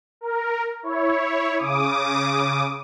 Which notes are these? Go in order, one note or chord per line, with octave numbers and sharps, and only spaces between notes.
A#4
E4 C#5
C#3 D6 D#6